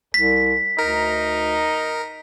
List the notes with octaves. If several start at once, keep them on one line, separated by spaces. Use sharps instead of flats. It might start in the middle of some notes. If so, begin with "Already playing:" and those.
C2 B6
D2 D#4 A#4